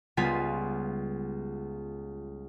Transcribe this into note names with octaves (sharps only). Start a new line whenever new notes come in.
C#2 G3 B3 F4 G#5 B6